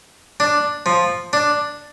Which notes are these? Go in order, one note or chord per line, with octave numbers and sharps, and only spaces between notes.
D4
F3
D4